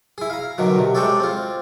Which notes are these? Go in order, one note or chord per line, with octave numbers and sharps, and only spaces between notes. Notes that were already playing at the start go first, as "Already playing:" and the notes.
E4 G#4
F5 A#5
B2 D3 D#3 F#3
C3
G#3 A3 D4 G4 A4 C#5
C4 F4